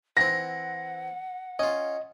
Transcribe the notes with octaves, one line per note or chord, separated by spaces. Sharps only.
E3 C4 F#5 A#6
C#4 F4 D#5